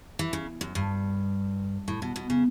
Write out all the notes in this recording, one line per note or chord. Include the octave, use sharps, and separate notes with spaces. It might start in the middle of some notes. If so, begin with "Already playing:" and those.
E3
C#3
F#2
G2
A2
B2
B2
C#3